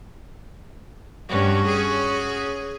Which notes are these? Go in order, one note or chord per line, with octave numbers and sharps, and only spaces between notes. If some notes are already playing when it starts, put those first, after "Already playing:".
G2 C#4 F#4
G#4